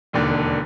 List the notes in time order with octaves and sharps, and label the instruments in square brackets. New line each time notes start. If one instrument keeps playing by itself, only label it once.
[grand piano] E1 D#2 D3